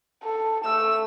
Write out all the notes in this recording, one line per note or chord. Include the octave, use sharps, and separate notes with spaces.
A4
A3 E6